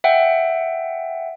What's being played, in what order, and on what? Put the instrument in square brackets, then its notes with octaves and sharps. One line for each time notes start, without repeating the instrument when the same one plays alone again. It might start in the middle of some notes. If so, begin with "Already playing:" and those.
[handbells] E5 F#5 G5